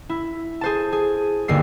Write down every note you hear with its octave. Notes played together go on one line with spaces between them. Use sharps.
E4
G#4 C5 A5
G#4
G1 D#2 A#3 E6 C7